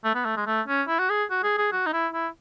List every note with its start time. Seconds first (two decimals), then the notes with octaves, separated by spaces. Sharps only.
0.04 A3
0.15 B3
0.25 A3
0.37 G#3
0.47 A3
0.68 C#4
0.88 E4
0.99 F#4
1.10 G#4
1.31 F#4
1.43 G#4
1.58 G#4
1.72 F#4
1.86 D#4
1.93 E4
2.13 E4